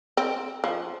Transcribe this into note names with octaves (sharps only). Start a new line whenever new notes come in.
C4
F3